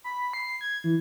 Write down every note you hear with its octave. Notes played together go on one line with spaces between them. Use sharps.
B5
C7
G#6
E3